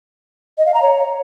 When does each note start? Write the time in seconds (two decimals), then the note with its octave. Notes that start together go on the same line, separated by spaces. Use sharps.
0.58 D#5
0.66 F5
0.74 A#5
0.82 C#5